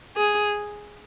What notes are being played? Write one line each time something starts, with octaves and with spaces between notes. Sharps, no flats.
G#4